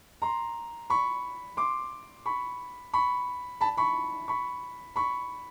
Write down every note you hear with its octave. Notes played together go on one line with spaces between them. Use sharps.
A#5 C6
B5 C#6
C6 D6
B5 C#6
B5 C#6
A5 B5
B5 C#6
B5 C#6
B5 C#6